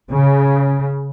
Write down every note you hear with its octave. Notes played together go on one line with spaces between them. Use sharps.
C#3